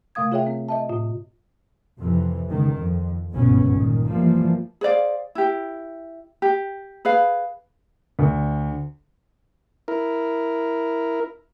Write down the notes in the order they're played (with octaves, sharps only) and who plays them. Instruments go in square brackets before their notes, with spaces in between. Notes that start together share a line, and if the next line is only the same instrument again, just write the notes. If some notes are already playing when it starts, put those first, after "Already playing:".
[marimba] C3 A3 F5 D#6 G#6
F4 G#4 C#5 E5 G5
C4
D#5 E5 A5
A2 F4
[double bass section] F2 C3 E3
C#2 D#3
F2
G1 C#2 G#2 B2 B3 C#4
G2 A#2 D#3
E3 F3 G3 A#3
[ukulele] G#4 C5 D5 F5
E4 G4
G4
G#4 B4 F5
[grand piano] D2
[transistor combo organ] E4 A#4